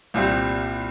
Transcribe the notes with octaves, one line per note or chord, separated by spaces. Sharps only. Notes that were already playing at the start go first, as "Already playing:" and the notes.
C2 A#2 G3 C4